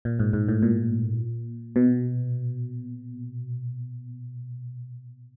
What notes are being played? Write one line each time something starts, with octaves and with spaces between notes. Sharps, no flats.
A#2
G#2
G#2
A2
A#2
B2